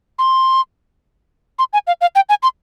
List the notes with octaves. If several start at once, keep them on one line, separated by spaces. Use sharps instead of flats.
C6
C6
G#5
F5
F5
G5
G#5
C6